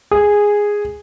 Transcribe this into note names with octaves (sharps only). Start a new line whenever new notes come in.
G#4